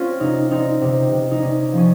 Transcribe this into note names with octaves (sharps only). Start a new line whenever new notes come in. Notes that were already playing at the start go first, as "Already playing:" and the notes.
Already playing: C4 C#4 F4
C3 D#4
C4 D#4
C3
C3
D#4
C3 C#4
F3 C#4